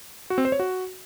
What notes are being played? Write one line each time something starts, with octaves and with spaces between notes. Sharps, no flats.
F#4
C4
C5
C#5
F#4